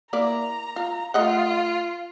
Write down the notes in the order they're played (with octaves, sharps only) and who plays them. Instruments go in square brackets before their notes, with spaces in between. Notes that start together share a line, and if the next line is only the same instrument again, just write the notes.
[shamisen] A#3 E4 D5 [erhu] A#5
[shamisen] F4
[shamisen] A3 D#5 F#5 [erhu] F4